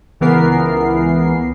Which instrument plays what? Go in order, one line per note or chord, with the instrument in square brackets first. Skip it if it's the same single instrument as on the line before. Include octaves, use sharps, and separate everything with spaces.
[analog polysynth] C#2 E3 B3 A#4 C7